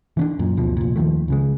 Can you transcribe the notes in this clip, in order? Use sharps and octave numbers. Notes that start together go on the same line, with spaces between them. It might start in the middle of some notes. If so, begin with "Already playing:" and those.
E3 C#4 D4
F#2 A#2
D2 B2 F3
F1 A#2
D#2 D#3 F3 A3
C#2 C#3 G#3